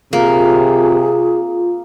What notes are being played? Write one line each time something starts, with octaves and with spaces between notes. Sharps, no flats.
C3 A#3 F4 G#4